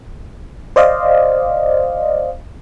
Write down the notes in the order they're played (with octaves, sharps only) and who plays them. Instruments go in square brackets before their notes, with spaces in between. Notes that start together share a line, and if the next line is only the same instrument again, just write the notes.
[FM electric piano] C5 D5 D#5 F5